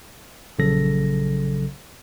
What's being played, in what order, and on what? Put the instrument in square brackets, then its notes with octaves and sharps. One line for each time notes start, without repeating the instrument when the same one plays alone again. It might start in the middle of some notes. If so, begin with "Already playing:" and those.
[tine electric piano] A#1 C#3 F#3 A4 A#6